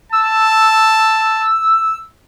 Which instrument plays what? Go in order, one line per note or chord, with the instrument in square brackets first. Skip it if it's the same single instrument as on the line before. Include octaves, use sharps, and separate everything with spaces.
[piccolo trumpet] A5 [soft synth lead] E6